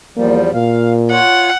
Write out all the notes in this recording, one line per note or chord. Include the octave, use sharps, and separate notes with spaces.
E2 F3 G3 A#3
A#2 F5
F4 C#5 F#5